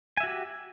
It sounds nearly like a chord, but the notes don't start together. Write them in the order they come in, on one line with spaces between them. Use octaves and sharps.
G#5 E5 F#4 G4